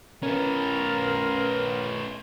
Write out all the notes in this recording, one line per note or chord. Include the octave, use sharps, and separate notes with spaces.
C#4 A#4 B4